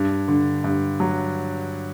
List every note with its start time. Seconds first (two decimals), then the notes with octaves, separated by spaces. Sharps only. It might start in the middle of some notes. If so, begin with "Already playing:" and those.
Already playing: G2
0.28 D3
0.64 G2
1.00 F#3